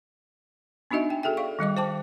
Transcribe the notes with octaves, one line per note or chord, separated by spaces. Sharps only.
B3 D4 D#4 F#4 D#5 E5
G5
F#4 G#4 A4 E5 G5
D5 F5 C#6
D#3 G3 D#5 D6
C5 G5 A5 D6